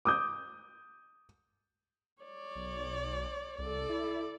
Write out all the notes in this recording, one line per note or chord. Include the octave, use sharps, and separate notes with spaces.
D6 D#6 G6
C#5 D5
B1
C2 A4 D5
E4